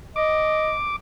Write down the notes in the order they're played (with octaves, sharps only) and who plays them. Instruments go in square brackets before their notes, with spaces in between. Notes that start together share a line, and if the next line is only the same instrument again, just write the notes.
[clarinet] D#5 [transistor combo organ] D6